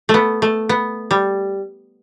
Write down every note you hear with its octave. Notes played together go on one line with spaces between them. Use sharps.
A3
B3
A3
B3
G3